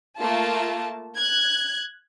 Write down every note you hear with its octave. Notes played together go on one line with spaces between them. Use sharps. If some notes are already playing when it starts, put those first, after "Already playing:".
A3 A#3 F4 A5
F#6 G#6